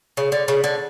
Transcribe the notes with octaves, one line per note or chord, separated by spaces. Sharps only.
C#3
D3
C#3
D3